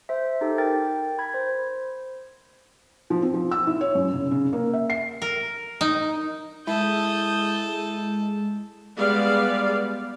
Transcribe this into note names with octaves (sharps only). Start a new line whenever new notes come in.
C5 E5
D#4 G4 A4
A#4 G5 A6
B5 G#6
C5
F3
C4
F3
E6
E4
C#5
F#2
C#3
C#3
A#3
E5
C7
A#4
D#4
G#3 E4 A4 D#6 G6
G3 G#3 B3 D5 F5